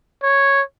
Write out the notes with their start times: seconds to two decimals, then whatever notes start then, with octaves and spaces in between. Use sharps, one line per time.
0.23 C#5